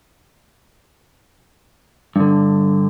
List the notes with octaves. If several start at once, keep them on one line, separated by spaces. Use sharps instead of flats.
G2 D3